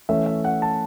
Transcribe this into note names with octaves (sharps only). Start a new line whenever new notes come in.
E3 A3 C#4 E5
E5
F#5
A5